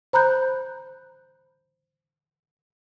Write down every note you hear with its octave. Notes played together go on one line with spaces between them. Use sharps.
C5 A#5 B5 F#6 G6